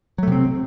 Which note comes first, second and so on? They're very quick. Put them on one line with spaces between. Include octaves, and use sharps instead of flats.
F#3 A3 C3 C4